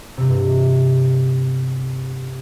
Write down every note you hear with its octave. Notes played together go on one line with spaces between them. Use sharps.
G2 C3